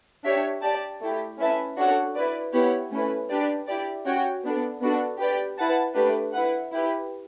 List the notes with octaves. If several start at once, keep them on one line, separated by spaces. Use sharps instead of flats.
D4 G4 C#5 E5
G4 D5 A5
A3 E4 G4
C#4 E4 B4 E5 A5
D4 F#4 A4 C#5 F#5
E4 B4 D5
B3 E4 G4 C#5 F#5
A3 C#4 E4 B4
D4 G4 B4 D5
E4 G4 D5
C#4 F#4 C#5 G5
B3 D4 A4
B3 D4 F#4 A4
G4 B4 D5 G5
E4 B4 F#5 A5
A3 D4 G4 B4
E4 B4 F#5
E4 G4 B4